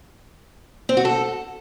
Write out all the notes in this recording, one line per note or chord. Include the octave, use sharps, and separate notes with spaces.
C4
F#4
A4